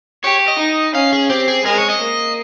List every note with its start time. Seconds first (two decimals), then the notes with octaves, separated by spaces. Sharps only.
0.23 G4 C#5
0.48 D#5
0.59 D#4
0.95 C#4 F5
1.13 G#4
1.30 C4 G4
1.48 G#4
1.65 G#3 A#4
1.78 C#5
1.90 D#5
2.01 A#3